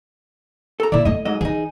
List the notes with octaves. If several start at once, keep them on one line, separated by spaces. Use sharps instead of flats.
A4 A#5
A#2 D3 E4 D5
A3 E4 D#5
G#2 F#3 D#5
E3 D#4 G#4